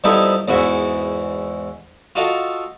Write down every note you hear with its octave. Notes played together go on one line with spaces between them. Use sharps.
F3 G3 A3 B3 D#4 E4
E2 G#2 E4 F#4
F4 F#4 A4 D#5 F5